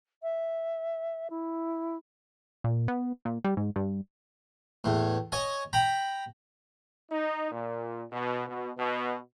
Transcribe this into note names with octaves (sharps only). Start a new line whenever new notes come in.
E5
E4
A#2
B3
A#2
G3
G#2
G2
E2 A2
C#5 D#5 G#5
G5 A#5 B5
D#4
A#2
B2
B2
B2